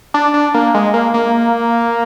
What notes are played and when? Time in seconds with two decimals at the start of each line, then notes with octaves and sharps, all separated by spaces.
0.14 D4
0.34 D4
0.54 A#3
0.74 G#3
0.94 A#3
1.14 A#3